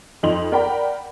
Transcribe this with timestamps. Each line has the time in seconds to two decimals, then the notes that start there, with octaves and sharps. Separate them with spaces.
0.23 F2 D#4 C6 F7 F#7
0.52 A#4 D5 F#5 G5 A#5 B5